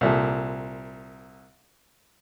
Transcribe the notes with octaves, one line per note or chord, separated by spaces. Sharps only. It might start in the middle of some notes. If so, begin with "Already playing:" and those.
C2 A#2 A4